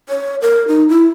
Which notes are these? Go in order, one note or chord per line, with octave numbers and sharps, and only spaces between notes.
C#5
A#4
D#4
E4